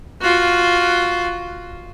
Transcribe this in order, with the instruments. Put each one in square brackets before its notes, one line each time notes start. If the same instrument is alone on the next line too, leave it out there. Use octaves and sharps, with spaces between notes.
[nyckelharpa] F4 F#4